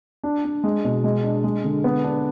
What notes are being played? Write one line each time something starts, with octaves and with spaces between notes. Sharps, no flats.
D4
D4
G#3
B2
G#3
D4
G#3
D3
B3
D4